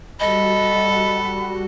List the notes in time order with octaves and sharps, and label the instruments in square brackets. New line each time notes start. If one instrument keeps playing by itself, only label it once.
[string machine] G3 F#4 [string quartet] A4 [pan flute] D#5 [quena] B5